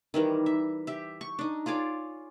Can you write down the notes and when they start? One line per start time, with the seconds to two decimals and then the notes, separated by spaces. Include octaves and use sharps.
0.14 D#3 E3 G3 A#4
0.46 E5
0.87 G4 E5
1.21 C#6
1.39 D4 D#4
1.66 F4 G#4 C#5 D5